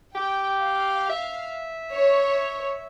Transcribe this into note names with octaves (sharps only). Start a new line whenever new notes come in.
G4 G5
F5
E5
C#5